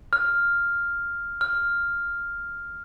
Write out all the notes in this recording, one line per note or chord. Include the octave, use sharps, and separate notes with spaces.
F6
F6